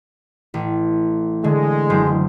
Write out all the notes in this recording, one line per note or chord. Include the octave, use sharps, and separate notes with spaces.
A1
D3 G#3
F#1 C5